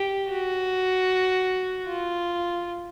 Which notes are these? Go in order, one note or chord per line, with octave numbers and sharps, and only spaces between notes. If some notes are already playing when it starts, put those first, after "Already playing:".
Already playing: G4
F#4
F4